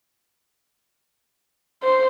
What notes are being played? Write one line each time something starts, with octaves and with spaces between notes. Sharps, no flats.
C5